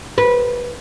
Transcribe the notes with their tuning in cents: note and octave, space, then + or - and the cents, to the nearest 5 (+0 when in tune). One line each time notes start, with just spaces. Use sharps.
B4 -20